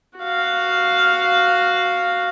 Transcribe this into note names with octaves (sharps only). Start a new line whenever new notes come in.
F#4 F5